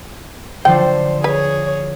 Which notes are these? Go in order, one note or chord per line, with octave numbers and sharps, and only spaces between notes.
D3 F3 D4 C5 G5
G#4 B4 C#5